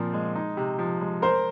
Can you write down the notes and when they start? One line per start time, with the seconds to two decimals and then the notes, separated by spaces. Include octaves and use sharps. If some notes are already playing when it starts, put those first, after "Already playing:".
Already playing: A#2 F3 C4
0.14 G#3
0.36 D#4
0.57 C3
0.79 F3
1.01 G#3
1.22 A#4 C5